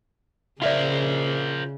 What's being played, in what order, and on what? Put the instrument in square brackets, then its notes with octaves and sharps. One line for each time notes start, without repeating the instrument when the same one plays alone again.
[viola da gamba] C#3 [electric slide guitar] F4 A#4 C5 [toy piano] D5 E5 F5